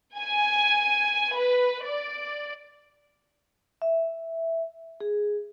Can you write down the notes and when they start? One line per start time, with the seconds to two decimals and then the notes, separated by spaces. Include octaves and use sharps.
0.19 G#5
1.36 B4
1.86 D5
3.82 E5
5.01 G#4